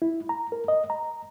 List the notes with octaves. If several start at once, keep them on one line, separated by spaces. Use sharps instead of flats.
E4
A#5
A#4
D#5
A#5